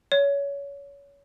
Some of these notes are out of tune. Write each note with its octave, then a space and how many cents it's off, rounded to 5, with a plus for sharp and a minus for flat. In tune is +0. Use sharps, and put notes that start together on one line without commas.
C#5 +25